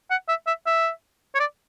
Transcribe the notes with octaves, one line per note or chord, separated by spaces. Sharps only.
F#5
E5
E5
E5
C#5
D5